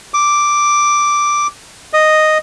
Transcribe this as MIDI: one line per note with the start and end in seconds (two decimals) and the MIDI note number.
0.14 1.47 86
1.93 2.38 75